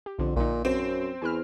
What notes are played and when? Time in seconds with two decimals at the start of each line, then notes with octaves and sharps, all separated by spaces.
0.06 G4
0.19 B1 F2 D3
0.36 A#1 A#2 D#4
0.65 F#2 C4
1.22 E2 G#5 B5 F6